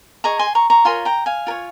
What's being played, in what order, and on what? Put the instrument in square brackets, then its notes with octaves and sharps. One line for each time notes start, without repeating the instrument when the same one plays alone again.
[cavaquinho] G#4 D#5 A#5 C#6
G#5 C6
A#5 C#6
A#5 C#6
F4 A#4 C#5 G#5 C6
G5 A#5
F5 G#5
F4 A#4 C#5